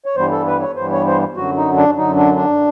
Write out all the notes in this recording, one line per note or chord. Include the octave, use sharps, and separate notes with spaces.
C#5
G2 E3 G3 B3 C5
A4
B4
C#5
G2 E3 G3 B3 C5
C#5
C5
F#2 D3 F#3 F#4
D#4
D4
F#2 D3 F#3 D#4
D4
D4